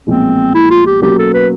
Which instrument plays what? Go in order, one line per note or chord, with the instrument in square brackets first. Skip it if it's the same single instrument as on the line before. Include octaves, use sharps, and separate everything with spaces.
[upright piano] B1 A#2 F3 G#3 [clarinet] C4
[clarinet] E4
F4
G4
[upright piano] B2 F#3 A#3 C#4 F#4 [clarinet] G4
[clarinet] A4
B4